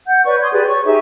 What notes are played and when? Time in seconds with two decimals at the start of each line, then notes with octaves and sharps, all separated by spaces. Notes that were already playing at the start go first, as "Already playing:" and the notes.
0.06 F#5 G6
0.24 B4 C#5 D5 C#6
0.41 C6 D#6 G6 G#6
0.52 G4 G#4 B4 D5
0.66 C#5 C#6
0.85 D#4 G4 G#4 E5